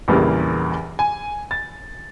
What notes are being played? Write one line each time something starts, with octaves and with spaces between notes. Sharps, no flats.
A#1 E2 C#3 E3 G3 A#3
G#5
A6